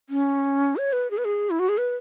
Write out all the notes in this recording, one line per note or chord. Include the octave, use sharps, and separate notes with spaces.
C#4
C#5
B4
G#4
B4
G#4
E4
F#4
G#4
B4